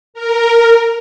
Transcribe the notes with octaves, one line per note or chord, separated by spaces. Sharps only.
A#4